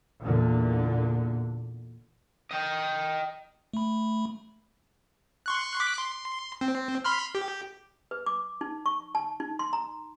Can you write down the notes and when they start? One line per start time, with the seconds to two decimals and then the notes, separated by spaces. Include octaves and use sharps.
0.22 E2 A#2 D3
2.51 D#5 G5
3.73 A3 B5
5.46 C6 C#6 F#6
5.80 D6 F#6 B6
5.98 C6
6.61 C4
7.04 B5 C6 F6
7.35 G4
8.11 B4
8.26 D6
8.61 D#4
8.86 C#6
9.15 A5
9.40 D#4
9.59 C6
9.73 A#5